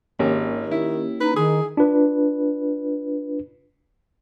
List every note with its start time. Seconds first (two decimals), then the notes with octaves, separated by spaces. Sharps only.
0.19 G#1 D#3 A#3 C#4 G4
0.71 E4
1.20 D#4 B4
1.36 D#3 G#4
1.77 D4 F4 B4